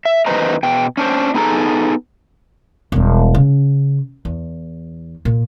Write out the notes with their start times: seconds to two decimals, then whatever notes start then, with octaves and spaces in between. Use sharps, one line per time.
0.05 E5
0.26 E2 D#3 B4 C5 D#5 A#5
0.63 B2 G5
0.97 C#4 D4 C5
1.34 B3 D#4 G#4 A4 A#5
2.92 E1 G3
3.35 C#3
4.25 E2
5.25 A#2